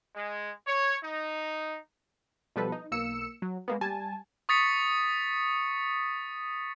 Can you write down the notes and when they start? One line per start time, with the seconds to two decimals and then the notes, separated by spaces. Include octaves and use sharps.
0.15 G#3
0.67 C#5
1.03 D#4
2.56 B2 F3 G3 A4 B4
2.72 D#4
2.92 B1 A#3 E6 C#7 E7
3.42 F#3
3.68 G#3 A#3 B3
3.81 G3 G#5 A5
4.49 C#6 D#6 A6 B6 C#7